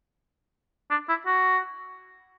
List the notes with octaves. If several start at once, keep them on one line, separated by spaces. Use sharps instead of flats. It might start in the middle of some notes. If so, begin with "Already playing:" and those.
D4
E4
F#4